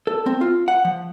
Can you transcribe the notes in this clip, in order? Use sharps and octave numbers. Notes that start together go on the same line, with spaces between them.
A4
C4
F4
F#5
F3